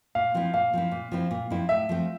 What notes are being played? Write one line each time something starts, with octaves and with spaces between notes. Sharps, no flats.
A#2 F5
F3 C4 E4
A#2 F5
F3 C4 E4
A#2
F3 C4 E4
A#2
F3 C4 E4
A2 E5
F3 A3 C4